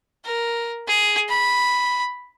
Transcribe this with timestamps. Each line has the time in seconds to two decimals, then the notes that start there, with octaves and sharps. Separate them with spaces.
0.25 A#4
0.88 G#4
1.29 B5